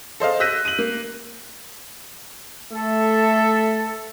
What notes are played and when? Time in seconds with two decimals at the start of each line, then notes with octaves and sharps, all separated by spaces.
0.20 A4 C5 D#5 F5
0.40 E6 F#6 G6 A#6 B6 D#7
0.65 D#7 F#7
0.79 A#3
2.72 A3 A4 E5